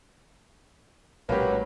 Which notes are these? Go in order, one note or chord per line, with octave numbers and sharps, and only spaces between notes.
A#1 A2 F#3 G#3 A#3 C#4 G4 B4